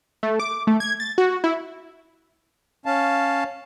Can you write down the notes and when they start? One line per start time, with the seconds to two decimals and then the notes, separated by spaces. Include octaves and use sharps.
0.23 A3
0.40 D6
0.67 A3
0.80 G#6
1.00 A6
1.18 F#4
1.44 E4
2.86 C#4 F5 A5